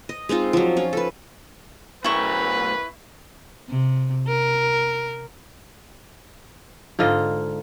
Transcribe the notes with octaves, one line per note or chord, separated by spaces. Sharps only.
D#5
G#3 C4 D#4 F4
F3 F#3
C#4 F4
A4 B4
B1 E4 A#4 B4 C#6
C3
A#4
G#2 D3 F4 D#5